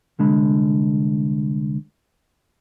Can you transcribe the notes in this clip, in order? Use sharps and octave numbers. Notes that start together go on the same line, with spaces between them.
C2 D3 G#3 B5